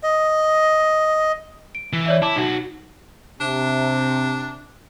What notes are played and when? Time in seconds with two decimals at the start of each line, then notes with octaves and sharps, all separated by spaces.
0.03 D#5
1.75 D7
1.93 E3
2.06 C#5 D5 E5
2.22 E4 A5 D6
2.36 B1 D#4 F#4
3.40 C3 D4